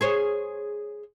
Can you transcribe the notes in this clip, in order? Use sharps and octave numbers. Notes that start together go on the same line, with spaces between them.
G#4 C5 C#5